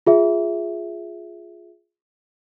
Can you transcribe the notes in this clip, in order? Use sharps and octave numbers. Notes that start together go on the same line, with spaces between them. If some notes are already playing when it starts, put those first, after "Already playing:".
F4 G#4 E5